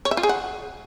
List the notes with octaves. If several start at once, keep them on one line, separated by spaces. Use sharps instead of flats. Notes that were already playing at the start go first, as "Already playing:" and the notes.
C#5
E5
F4
G#4
F#5